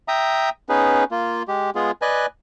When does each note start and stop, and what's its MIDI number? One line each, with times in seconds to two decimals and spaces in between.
0.08 0.50 76
0.08 0.50 79
0.08 0.50 82
0.08 0.50 87
0.69 1.04 59
0.69 1.04 61
0.69 1.04 63
0.69 1.04 68
0.69 1.04 71
1.11 1.43 58
1.11 1.43 65
1.48 1.70 56
1.48 1.70 67
1.75 1.91 56
1.75 1.91 59
1.75 1.91 65
1.75 1.91 68
2.02 2.26 71
2.02 2.26 74
2.02 2.26 75
2.02 2.26 80
2.02 2.26 90